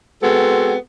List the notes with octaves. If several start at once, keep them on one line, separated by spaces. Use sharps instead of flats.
G#3 B3 C4 F#4 A4